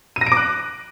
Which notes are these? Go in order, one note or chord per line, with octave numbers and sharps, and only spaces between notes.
D#7
A#6
D7
D6
F#6